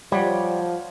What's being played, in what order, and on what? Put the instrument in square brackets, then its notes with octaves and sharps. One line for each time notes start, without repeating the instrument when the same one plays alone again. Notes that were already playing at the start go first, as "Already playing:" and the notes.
[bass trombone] F3 [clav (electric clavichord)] G3 [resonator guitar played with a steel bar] C#5 D#5 F#5